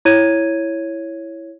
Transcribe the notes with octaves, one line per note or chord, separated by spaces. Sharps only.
E4 C#5 G#6 D#7